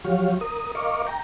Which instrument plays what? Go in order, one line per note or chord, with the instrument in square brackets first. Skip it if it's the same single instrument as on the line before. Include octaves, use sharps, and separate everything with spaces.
[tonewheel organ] F3 F#3 F#4 G4 C#5 F5
A#4 D#6
A#4 D#5 F5 C#6 D6
G5 A#5